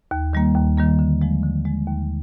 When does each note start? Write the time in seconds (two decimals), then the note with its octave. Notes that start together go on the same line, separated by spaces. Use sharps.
0.11 D#2
0.33 D#3 G3 A#3
0.55 D#2
0.78 D#3 G3 A#3
0.99 D3
1.21 F3 G#3
1.43 D3
1.65 F3 G#3
1.87 D#2